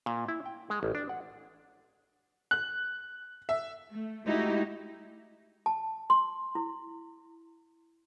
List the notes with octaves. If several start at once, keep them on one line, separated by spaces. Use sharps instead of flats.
A#2
E4
G5
G#3
A1
D4
F#5
F#6
E5
A3
G#3 A3 D#4 E4 F#4 G4
A5
C6
E4